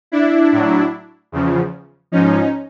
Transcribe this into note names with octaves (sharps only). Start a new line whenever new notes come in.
D4 E4
A2 F#3
E2 C#3 F3
G#2 F3 C#4 D#4